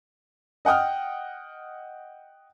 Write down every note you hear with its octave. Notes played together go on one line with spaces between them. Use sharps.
D#5 F#5 G5 D#6 F6